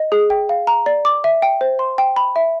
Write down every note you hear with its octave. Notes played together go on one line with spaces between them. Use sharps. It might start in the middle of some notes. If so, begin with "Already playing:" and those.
Already playing: D#5
G#4
G5
F5
A#5
D5
D6
E5
G5
C5
C6
G5
B5
E5